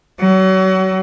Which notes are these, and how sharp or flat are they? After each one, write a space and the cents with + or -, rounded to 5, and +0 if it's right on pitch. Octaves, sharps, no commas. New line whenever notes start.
F#3 +35